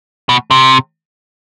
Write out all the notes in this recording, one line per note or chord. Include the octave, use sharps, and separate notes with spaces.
B2
C3